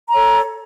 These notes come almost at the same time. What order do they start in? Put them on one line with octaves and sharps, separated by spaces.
A#5 C#5 A4